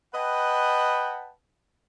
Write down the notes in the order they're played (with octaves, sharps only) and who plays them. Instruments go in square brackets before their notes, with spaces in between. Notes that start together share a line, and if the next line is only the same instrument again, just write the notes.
[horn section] B4 D#5 F#5 G5 A5 B5